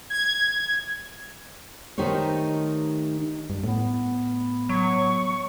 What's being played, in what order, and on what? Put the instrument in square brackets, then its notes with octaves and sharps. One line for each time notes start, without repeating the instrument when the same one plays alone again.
[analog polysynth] G#6
[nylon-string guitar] D#3 A3 D#4 G4 C5 C#5
[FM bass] G2
[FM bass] A2 [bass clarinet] B3
[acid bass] F#3 [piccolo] C#6